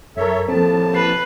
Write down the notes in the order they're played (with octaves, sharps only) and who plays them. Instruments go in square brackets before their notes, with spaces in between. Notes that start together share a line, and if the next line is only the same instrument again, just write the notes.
[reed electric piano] F#2 A#4 [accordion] A4 C#5 E5
[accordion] D#2 A2 A5 [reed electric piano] F3 C4 [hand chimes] A4
[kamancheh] B4 [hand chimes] C7